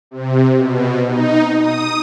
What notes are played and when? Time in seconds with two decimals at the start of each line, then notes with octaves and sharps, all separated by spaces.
0.11 C3
0.56 B2
1.06 D#4
1.59 D#6